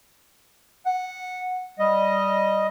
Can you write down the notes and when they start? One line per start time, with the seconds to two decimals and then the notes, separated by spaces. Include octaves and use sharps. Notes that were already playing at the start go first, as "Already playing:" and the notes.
0.86 F#5
1.79 G3 D#5